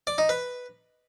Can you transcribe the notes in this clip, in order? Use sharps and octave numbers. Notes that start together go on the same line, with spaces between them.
D5
D#4
B4